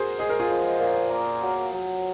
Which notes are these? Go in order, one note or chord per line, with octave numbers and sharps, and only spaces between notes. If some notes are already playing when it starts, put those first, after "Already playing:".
Already playing: F#4 G#4 A#4 C5
G#3 G#4
A#4
F4 G#4
F3
A#2
A#3
F#3
F#3